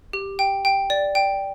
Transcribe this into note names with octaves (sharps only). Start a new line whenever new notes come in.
G4
G5
G5
D5
G5